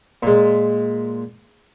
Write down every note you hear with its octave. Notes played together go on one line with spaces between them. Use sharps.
A#2 G#3